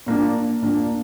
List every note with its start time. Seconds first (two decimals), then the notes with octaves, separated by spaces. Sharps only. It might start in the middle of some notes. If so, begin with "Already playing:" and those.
0.06 A#2 A#3 D4
0.62 A#2 A#3 D4